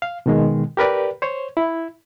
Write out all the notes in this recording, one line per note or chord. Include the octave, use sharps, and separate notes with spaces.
F5
B2 D#3 G#3
G4 A#4 B4 D5
C5 C#5
E4